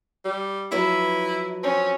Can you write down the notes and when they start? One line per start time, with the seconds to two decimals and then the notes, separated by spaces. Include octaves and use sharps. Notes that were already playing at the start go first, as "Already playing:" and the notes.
0.25 G3
0.72 F3 F#3 E4 B4
1.63 C4 C#4